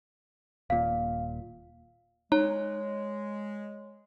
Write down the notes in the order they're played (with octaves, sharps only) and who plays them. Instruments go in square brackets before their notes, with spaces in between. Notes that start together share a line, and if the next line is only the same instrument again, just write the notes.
[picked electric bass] D#1 A#2 [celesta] F5
[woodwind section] G#3 [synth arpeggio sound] D#4 [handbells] C#5